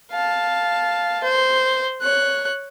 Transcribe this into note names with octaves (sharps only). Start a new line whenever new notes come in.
F5 A5
C5
C#5 F#6